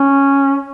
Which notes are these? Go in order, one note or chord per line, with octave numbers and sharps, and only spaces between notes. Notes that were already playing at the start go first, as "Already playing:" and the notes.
Already playing: C#4